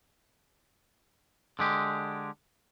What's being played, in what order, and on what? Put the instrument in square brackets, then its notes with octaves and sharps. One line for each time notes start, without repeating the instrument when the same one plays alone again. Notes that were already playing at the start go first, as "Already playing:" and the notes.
[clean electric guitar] D3 G#3 G4